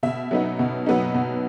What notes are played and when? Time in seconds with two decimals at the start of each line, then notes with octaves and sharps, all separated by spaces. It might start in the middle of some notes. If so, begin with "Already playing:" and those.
0.03 B2 E5
0.31 F#3 B3 D#4
0.59 B2
0.86 F#3 B3 D#4
1.14 B2